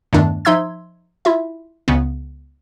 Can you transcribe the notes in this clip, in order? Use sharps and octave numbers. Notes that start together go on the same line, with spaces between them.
E2 G2 D#3 A3 D4
F3 D#4 E5 C6 E6 G#6
E4 F4 E5
C#2 C#3 B3